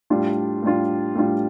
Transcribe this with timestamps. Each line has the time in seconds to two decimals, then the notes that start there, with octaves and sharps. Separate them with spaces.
0.10 A2 G3 D4 F4
0.63 A2 G3 D4 F4
1.15 A2 G3 D4 F4